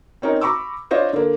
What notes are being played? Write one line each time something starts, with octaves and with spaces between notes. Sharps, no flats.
C4 C#4 D#4 A#4
A#5 B5 C#6 D6 E6
D4 F4 C5 C#5 D#5
D3 A#3